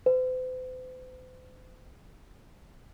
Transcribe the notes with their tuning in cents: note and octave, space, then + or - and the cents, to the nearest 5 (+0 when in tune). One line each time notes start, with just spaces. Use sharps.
C5 -45